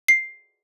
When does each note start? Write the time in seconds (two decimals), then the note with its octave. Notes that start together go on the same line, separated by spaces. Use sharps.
0.08 C7